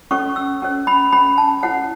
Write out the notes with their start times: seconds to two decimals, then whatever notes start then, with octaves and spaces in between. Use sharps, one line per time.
0.11 C#4 A4 C#5 C#6
0.36 E6
0.62 C#4 A4 C#5
0.87 B5
1.13 C#4 A4 C#5 B5
1.38 A5
1.63 E4 A4 C#5 F#5